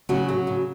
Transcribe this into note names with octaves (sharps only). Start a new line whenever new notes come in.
C#3 F#3 F#4
F#3
C#3